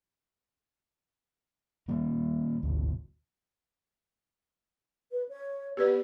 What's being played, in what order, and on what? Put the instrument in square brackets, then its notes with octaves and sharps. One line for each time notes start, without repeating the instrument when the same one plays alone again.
[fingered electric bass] D#3 G3 A#3
G#1 D2
[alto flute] B4
C#5
[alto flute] B3 [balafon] G4 B4 D5